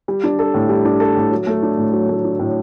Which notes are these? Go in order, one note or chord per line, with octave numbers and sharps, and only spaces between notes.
G3
D4
A4
A2
G3
D4
A4
A2
F#3
A3
D4
A2
F#3
A3
D4
A2